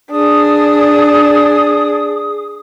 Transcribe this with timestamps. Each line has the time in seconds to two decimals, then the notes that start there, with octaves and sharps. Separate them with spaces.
0.11 D4 G#4 D#6